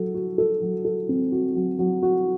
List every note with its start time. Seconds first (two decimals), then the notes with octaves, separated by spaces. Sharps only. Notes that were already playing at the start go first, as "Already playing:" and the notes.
Already playing: F#3 A4
0.15 F#4
0.38 A4
0.62 F#3
0.85 A4
1.09 C4
1.32 F#4
1.55 F#3
1.79 F#3
2.03 F#4